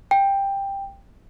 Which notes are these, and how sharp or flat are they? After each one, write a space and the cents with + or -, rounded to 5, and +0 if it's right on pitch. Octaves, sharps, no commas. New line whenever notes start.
G5 +10